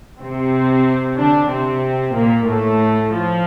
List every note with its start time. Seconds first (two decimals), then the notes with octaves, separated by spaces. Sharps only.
0.19 C3 C4
1.16 D3 D4
1.50 C3 C4
2.15 A#2 A#3
2.47 A2 A3
3.12 F3